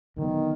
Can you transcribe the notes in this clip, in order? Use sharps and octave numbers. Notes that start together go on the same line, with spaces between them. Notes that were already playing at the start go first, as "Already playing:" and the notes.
D2 D3 D#3 F#3 B3